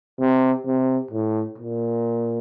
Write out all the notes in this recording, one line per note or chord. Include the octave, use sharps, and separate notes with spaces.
C3
C3
A2
A#2